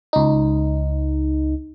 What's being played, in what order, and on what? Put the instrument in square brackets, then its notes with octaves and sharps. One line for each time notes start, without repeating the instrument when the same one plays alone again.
[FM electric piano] C#2 D#4